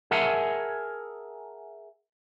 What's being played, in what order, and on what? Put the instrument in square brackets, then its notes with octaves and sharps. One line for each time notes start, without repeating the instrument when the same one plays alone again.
[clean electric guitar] G#4 A#4 E5 F#5 G#5 A5